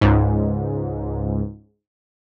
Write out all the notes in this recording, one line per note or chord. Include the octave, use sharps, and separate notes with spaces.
C#2 G#2